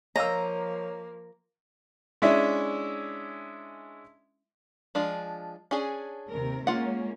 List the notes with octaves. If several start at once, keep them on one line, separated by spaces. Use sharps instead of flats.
F3 A#3 C#5 D#5 F5 A#5 E6
G#3 C#4 D4 E4 E5
F3 G#3 D4
C#4 D4 G#4
D#2 C3 A#4
G#3 A#3 C#4 F4 F#5